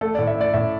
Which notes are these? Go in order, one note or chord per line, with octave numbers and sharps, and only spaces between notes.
A3 A4
A2 D5
E5
A3 D5
A2 E5